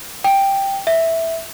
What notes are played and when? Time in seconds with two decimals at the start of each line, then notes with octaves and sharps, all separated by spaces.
0.24 G5
0.87 E5